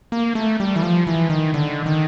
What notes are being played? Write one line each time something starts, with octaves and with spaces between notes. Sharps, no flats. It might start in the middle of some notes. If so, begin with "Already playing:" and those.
A#3
A3
G3
E3
F3
E3
D#3
D3
D#3